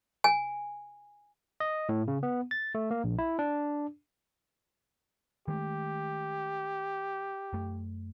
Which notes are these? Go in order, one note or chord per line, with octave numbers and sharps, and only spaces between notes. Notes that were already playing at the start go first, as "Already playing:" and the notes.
G#5
D#5
A2
C#3
B3
A6
A3
A#3
A#1
E4
D4
D#3 G#3 A3 G4
F#2 A3